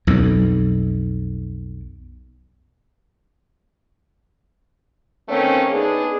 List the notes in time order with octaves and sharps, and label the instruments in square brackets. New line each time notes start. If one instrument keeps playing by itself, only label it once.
[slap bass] B1 F2
[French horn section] D#3 A3 A#3 C4 C#4
B3 D4 D#4 G#4